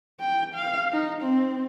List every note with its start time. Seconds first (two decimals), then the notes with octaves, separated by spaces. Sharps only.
0.20 G5
0.55 F5
0.92 D#4
1.21 C4